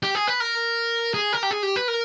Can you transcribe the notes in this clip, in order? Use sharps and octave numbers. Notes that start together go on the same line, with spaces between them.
G4
G#4
B4
A#4
G#4
A#4
G4
G#4
G4
B4
A#4